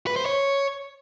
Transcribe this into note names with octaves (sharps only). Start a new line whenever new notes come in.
B4
C5
C#5